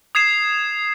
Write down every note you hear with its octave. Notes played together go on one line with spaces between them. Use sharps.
D#6 G#6 C7 E7